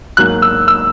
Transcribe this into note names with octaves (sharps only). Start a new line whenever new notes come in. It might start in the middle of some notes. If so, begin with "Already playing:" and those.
G#2 F#3 A#3 F#6
E6
E6